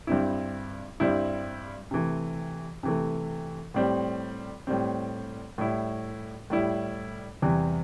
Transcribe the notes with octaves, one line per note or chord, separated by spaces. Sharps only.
G2 G3 C4 E4
G2 G3 C4 E4
C3 E3 A3
C3 E3 A3
A2 G3 C4
A2 G3 C4
A2 G3 E4
A2 G3 E4
E2 C3 E3 G3